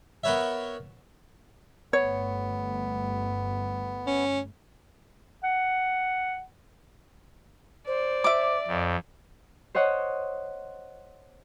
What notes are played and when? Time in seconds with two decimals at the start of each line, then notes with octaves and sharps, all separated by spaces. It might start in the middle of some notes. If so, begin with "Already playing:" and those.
0.24 B3 A#4 B4 C#5 E5
1.93 G1 A3 B3 C#5
4.07 C#4
5.44 F#5
7.87 C5 D5
8.24 E5 D6
8.68 F2
9.75 C5 C#5 D#5 F#5 C6